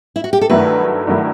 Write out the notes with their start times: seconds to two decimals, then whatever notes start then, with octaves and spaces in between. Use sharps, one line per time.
0.16 E4
0.24 F#4
0.33 G4
0.41 A4
0.49 G2 D#3 F#3 A3 E4 B4
1.07 G2 D#3 F#3 A3 E4